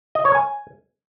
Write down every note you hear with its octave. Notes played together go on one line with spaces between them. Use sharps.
D#5
C#5
G#5